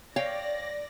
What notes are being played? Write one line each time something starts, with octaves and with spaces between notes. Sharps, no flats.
C#5 D5 F5 G5 A#6